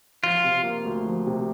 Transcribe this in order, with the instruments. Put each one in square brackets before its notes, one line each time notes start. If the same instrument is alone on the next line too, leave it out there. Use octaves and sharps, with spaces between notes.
[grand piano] F3 [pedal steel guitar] F4
[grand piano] C3
A#3
D2
F3
C3